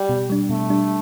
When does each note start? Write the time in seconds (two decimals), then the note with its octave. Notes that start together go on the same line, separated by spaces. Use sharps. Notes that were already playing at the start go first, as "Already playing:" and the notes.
Already playing: G3
0.09 B2
0.30 G3 D4
0.49 B2 A3
0.70 G3 D4